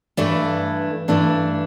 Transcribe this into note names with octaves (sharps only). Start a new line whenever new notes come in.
G2 E3 A3 D4
G2 E3 A3 D4